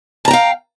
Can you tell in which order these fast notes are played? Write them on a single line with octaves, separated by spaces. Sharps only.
A5 A#5 G5 F5